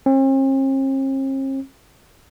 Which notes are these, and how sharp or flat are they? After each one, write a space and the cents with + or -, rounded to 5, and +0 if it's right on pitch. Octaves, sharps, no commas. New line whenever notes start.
C4 +45